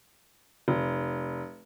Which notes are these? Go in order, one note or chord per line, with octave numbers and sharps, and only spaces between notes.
F1